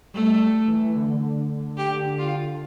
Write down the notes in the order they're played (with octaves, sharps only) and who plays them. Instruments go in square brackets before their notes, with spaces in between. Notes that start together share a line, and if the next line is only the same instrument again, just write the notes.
[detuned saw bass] G3 [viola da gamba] A3
[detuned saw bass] E3
D3
[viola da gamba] G4
F4